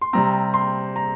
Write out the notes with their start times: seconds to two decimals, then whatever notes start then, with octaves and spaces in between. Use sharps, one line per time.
0.01 C6
0.13 C3 G3 C4 A#5
0.54 C6
0.96 A#5